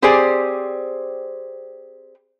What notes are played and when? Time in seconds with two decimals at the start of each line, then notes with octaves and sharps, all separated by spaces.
0.02 C4 G4 G#4 C5 D5 G#5